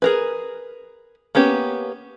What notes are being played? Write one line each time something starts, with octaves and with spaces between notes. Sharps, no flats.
G#4 A#4 B4
A#3 B3 C#4 G4